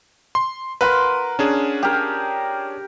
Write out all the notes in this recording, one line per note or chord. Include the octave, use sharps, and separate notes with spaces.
C6
A#4 B4 F#5 C6
C#4 D4 G#4
G4 A#4